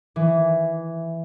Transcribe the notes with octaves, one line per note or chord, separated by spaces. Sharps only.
E3